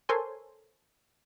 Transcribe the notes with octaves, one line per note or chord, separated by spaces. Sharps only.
A4 A#4 C5 C#5 G#5 C6